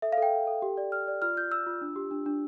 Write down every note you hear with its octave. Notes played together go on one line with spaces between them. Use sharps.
A4 E5
F5
A4 G5
A4
A4
G4
D5
D5 F6
D5
F4 F6
F4 G6
F4 E6
F4
D4
G4
D4
D4